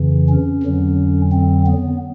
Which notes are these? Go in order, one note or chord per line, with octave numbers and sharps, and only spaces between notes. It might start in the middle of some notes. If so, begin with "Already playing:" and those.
Already playing: F2 C#3 E3
C#4
F2 D3 F#3
C4
B3